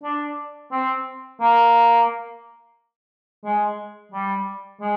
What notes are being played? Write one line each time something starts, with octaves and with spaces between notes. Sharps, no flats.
D4
C4
A#3
G#3
G3
G#3